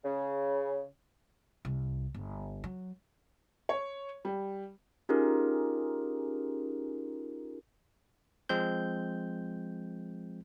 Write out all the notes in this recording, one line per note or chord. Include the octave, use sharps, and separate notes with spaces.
C#3
C2
G1
F#3
C#5
G3
C#4 D#4 F4 G4 G#4 A#4
F3 G#3 C4 G6